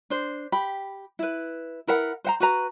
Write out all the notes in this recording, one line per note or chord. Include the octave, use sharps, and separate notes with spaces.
D4 C5
G4 B5
E4 B4
E4 A#4 B4 F#5
C5 F#5 A#5
F#4 B4 A#5